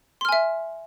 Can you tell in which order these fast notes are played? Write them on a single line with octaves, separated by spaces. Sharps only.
C6 F6 G#5 E5